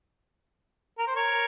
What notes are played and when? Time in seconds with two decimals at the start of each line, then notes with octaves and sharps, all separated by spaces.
0.98 A#4
1.07 C5
1.16 A#4 C#5